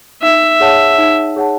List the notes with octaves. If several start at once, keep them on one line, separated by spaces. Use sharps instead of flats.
D#4 E5
G#4 C#5 F#5 A5
D#4
G#4 C#5 F#5 A5